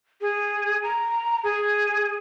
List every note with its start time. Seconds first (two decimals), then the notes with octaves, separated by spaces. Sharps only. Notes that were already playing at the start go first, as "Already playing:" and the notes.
0.21 G#4
0.83 A#5
1.44 G#4